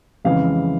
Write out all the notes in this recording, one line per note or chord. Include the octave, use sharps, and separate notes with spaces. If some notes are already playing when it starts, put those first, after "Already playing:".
F2 C#3 E3 G#3 F5